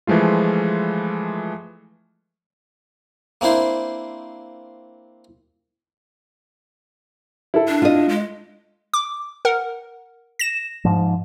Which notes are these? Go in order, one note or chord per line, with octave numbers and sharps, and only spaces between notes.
E3 F3 G#3 A3 F4
A#3 C4 D4 E4 C5
E4 A4
D4
F4 D#5
G#3
D6
A#4 F#5
A#6 E7
G#2 F3